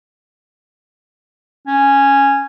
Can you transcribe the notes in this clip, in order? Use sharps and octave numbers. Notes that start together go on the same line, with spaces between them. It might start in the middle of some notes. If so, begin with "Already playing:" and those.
C#4